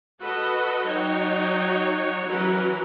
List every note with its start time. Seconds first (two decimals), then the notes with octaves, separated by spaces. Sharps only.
0.20 F#4 A4 B4 D#5
0.84 F#3 D#4 F#4 C#5 D#5 G5
2.26 E3 F#3 C#4 F#4 A#4 B4